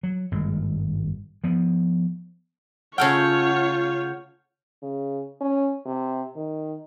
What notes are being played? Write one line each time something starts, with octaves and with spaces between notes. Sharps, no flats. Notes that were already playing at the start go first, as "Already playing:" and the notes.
F#3
G#1 G2 A#2 G#3
F3 B3
C#3 A3 F4 C#5 F#5 G5 F6 G6
C#3
C#4
C3
D#3